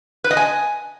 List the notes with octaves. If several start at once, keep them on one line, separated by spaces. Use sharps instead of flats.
B4
D#5
G#5